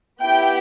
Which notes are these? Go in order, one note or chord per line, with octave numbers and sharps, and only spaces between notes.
B3 E4 G4 G5